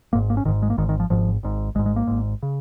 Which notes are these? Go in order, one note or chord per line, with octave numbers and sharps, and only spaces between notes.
G#1 G#2 A#3
A#3
C#4
G#1 G#2 D#3
G#3
A#3
G#1 G#2 D#3
D#3
F3
G#1 G#2 F3
G#1 G#2
G#1 G#2 G#3
G#3
A#3
G#1 G#2
C#3